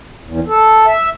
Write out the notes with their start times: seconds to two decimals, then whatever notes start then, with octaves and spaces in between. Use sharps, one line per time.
0.25 E2
0.48 A4
0.86 E5